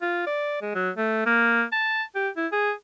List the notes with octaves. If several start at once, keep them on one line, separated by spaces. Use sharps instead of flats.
F4
D5
G#3
F#3
A3
A#3
A5
G4
E4
G#4